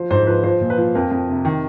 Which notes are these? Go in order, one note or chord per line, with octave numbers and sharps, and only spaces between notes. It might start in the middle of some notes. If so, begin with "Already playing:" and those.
Already playing: F3 C5
G#2 C5
F3 B4
F3 C5
A#2
B4
F3
F2 A#4
F2
C3
D#3